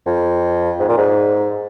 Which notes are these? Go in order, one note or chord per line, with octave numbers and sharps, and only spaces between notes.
F2
G#2
A#2
G#2